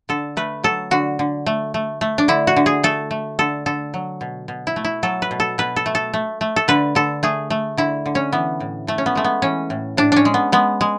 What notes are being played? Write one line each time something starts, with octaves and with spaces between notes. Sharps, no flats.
D3 A4
A3 B4
F#3 A4
D3 F#4
D3
A3
A3
A3
D4
D3 E4
F#4
D3
G#4
A3 A4
A3
D3 A4
D3 A4
F#3
B2
B2
E4
A3
E4
F#3 A4
B4
B2
A4
B2 B4
A4
A3
A4
A3
A3
A4
D3 B4
D3 A4
A3 G#4
A3
D3 E4
D3
C#4
E3 B3
A2
A2 A3
C#4
B3
G#3 A3
B3
E3 C#4
A2
A2 D4
C#4 D4
G#3
B3
G#3 B3
G#3